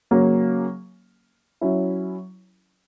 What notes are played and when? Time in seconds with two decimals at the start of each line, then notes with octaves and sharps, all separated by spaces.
0.11 C#3 F#3 A#3 C#4
1.61 F#3 C#4 E4